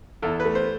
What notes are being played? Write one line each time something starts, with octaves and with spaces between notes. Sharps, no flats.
E2 A4
A3 B4
C5